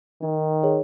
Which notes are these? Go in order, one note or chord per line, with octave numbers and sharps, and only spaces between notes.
D#3 D#4
G#4 C#5